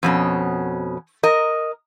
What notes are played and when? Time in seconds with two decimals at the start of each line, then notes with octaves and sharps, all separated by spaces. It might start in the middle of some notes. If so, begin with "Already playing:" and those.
0.03 F2 B2 C#4
1.23 A#4 D#5